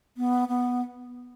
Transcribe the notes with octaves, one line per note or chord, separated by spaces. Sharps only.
B3
B3